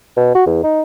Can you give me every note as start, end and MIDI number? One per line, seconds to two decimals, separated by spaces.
0.17 0.30 47
0.35 0.42 66
0.46 0.61 40
0.64 0.82 63